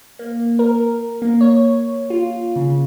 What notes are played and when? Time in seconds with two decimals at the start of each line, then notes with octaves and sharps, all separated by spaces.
0.19 A#3
0.59 A#4
1.22 A#3
1.41 C#5
2.10 F4
2.56 C#3